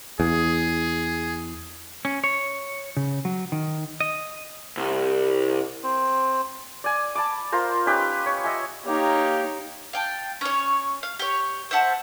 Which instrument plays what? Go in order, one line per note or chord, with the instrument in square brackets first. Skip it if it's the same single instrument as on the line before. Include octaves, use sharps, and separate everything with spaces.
[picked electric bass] E2 [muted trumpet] G#4
[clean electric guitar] C#4
C#5
C#3
F#3
D#3
D#5
[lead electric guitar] C2
[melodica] C4
[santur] D5 G#5
A5 B5 D6
F4 A#4 C5 A#5
C#4 D#4 G4 B4
C#5
D#5 E5 G#5
[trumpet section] A#3 G4 [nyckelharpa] D#4 C#5
[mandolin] F5 G5 A5
C#4 C#5
F5
G4 C#5
C5 E5 F#5 A5